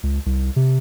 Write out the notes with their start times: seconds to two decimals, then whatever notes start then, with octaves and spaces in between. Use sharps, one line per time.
0.03 C#2
0.26 C2
0.56 C3